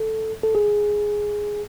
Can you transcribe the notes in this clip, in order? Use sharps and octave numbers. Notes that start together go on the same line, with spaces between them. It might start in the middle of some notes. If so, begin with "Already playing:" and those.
Already playing: A4
A4
G#4